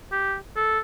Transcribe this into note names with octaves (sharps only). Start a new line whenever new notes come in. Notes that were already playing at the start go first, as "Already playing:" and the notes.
G4
A4